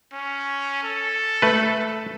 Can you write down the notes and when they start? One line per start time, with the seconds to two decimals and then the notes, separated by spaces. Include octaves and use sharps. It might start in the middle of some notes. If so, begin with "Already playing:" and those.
0.13 C#4
0.83 A4
1.42 A3 B4